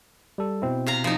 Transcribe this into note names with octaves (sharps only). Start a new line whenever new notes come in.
G3 A4
B2 C4 E4
C3 F5 A#5
F3 D#4